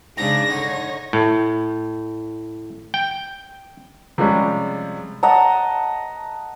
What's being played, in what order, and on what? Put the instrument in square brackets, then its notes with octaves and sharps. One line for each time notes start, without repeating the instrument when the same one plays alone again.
[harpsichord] G#2 C#3 [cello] D4 G#4 [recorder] A#6
[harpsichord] D3 [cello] D#4 C#5
[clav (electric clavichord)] A2
G5
[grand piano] C3 F3 G3 G#3 C#4
[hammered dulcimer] D#5 F#5 A5 A#5